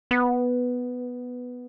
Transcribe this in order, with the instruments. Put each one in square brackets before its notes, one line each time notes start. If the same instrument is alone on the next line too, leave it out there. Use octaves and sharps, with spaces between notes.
[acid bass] B3